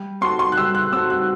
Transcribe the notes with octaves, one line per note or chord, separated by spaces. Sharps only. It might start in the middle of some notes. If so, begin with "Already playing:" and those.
Already playing: G3
C4 F#4 A4 C6
C6
F#6
G3 E6
F#6
C4 F#4 A4 E6
F#6